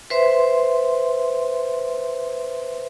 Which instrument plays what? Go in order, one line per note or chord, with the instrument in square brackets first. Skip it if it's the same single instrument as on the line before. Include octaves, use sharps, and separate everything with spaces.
[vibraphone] B4 C5 E5 C6